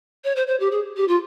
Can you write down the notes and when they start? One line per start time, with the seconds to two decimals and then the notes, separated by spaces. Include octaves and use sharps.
0.24 C#5
0.36 C5
0.47 C5
0.59 G4
0.71 G#4
0.96 G4
1.08 F4